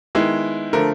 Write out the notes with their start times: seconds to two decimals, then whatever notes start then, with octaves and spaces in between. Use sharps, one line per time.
0.15 D#3 G#3 B3 E4
0.73 D3 F3 A3 A#4